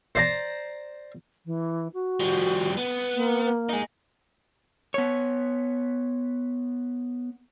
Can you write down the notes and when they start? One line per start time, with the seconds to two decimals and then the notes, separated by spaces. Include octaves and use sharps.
0.15 C5 D5 A#5
1.45 E3
1.93 F#4
2.20 F3 G3
2.77 B3
3.14 A#3
3.69 D#4 G#4
4.94 B3 C#5